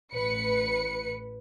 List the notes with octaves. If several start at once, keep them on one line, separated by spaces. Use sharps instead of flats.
A1 B4 C#7